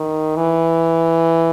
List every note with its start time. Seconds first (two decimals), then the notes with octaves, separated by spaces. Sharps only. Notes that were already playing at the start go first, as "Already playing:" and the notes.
Already playing: D#3
0.36 E3